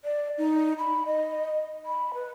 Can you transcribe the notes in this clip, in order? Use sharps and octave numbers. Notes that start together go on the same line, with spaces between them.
D5
D#4
B5
D#5
B5
B4